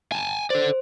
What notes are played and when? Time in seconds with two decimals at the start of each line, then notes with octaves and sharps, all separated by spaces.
0.12 G#5 A5
0.50 A4 C5 D5